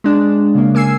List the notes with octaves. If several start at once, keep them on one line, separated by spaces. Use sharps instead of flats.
G#3 D4
C#3 A#3
A#3 G#5 E6 C7